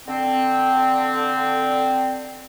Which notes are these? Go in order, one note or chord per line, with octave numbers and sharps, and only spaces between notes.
D3 C4